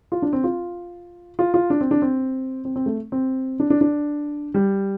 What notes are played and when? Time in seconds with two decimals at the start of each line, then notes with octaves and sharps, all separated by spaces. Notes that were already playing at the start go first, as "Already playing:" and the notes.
0.12 F4
0.22 D4
0.33 C4
0.44 F4
1.39 F4
1.54 F4
1.70 D4
1.81 C4
1.91 D4
2.02 C4
2.65 C4
2.76 C4
2.86 A3
3.12 C4
3.60 D4
3.70 D4
3.81 D4
4.54 G3